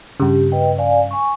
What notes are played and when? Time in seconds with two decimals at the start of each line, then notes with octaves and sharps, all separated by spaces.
0.20 G2 C#3 G4
0.52 B4 D#5 G5
0.78 D5 F5 G#5
1.11 G#5 C#6